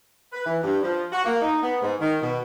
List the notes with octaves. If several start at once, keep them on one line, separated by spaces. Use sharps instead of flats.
B4
E3
G2
F3
F#4
A#3
D#4
B3
G#2
D#3
B2